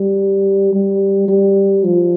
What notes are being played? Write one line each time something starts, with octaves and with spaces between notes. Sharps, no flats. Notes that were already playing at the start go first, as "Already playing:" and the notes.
Already playing: G3
G3
G3
F3